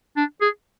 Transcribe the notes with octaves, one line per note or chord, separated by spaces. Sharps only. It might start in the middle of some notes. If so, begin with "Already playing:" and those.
D4
G#4